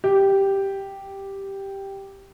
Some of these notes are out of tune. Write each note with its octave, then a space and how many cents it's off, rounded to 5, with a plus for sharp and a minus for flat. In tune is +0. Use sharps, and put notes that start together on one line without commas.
G4 +0